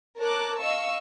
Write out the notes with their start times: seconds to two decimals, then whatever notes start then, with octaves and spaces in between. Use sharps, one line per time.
0.19 A#4 C#5 A5 D6 F#6
0.59 D#5 F5 C#6 E6